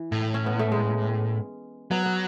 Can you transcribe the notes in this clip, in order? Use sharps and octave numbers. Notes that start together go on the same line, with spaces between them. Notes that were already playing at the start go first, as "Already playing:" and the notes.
Already playing: E3
A2
C#4
B3
A3
G#3
F#3 B3
B3